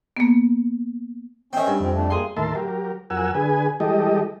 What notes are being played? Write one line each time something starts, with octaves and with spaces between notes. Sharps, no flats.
A#3 B3
D#3 C4 C#4 E5 G5
G2
F2 C4
A3 D4
A#3 G#4 C6
D#2 A2 A#4 E5 A5 C6
F#3 G4 A#4
F2 F#3 A#4 F#5 G#5 E6
D3 G#4 B4 G#5
E3 G3 G#3 G4 A4 D#5